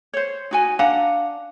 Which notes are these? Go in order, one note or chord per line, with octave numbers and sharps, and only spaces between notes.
C5 C#5
D#4 F#4 G#5
D4 F5 F#5 A#5